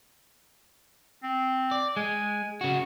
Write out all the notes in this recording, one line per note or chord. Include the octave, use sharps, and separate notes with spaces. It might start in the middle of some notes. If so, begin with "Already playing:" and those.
C4
D5
G#3 G#5
C#3 F#4